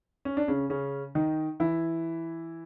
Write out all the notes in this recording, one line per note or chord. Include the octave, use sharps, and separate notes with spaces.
C#4
D4
C#3 C#4
C#3 C#4
D#3 D#4
E3 E4